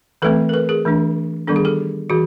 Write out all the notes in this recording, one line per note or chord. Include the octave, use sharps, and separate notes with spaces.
E3 A3 C4 A4 B4
A#4
A4 B4
G#4 A#4
E3 A3 D4
D#3 G3 B3 D4 A4
G#4
G4 A4
E3 F#4 G#4